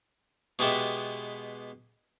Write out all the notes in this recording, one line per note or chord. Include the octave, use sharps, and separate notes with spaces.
B2 G#3 B3 G4 E5